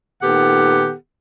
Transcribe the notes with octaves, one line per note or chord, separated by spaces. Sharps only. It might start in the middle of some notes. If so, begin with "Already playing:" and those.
A#2 D#3 B3 G4 A4 F#5